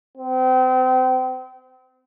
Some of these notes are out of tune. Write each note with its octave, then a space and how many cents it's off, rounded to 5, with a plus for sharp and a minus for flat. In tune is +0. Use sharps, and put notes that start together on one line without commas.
C4 -35